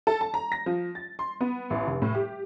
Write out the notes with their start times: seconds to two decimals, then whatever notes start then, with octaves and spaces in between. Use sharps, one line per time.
0.07 A4
0.21 A5
0.34 A#5
0.52 A#6
0.66 F3
0.95 A6
1.19 C6
1.41 B3
1.70 A1
1.87 F1
2.02 A2
2.15 G4